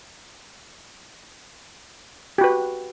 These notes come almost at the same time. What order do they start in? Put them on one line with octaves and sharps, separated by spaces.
G4 F#4 B4